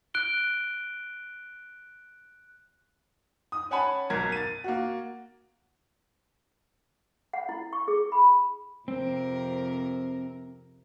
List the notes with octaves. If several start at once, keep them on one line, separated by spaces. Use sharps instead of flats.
F#6 D7 G7
D#6
C#4 F#5 G#5 A5 B5
B1 A#4 G#6
A6 D#7
A#3 F#4
F#5
E4
C#6
G#4
B5
F2 C3 C4 A#4